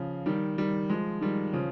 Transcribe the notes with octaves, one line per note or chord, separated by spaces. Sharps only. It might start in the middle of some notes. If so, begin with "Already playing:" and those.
Already playing: C#3 F3
D#3 G3
D#3 G3
F3 G#3
D#3 G3
C#3 F3